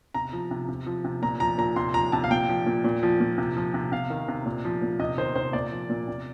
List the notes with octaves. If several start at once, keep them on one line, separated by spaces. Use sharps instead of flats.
C3 A#5
F3
C3
C3
F3
C3
A#2 A#5
F3 A#5
A#2 A#5
C3 C6
F3 A#5
C3 A5
F5
A#2 G5
F3
A#2
A#2
F3
A#2
C3
F3
C3
C3 F5
D#3
C3
A#2
F3
A#2
C3 D#5
D#3 C5
C3 C5
A#2 D5
F3
A#2
C3